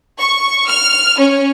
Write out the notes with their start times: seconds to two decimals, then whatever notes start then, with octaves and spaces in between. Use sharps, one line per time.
0.19 C#6
0.68 F6
1.19 C#4